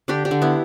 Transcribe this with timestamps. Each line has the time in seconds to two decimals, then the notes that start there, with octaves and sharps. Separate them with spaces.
0.08 D3 D4 G4
0.25 D4 G4
0.31 D3
0.42 B3 E4